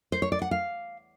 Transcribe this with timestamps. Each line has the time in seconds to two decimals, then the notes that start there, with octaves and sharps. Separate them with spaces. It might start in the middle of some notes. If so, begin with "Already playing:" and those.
0.12 C5
0.22 C#5
0.32 D5
0.42 F#5
0.51 F5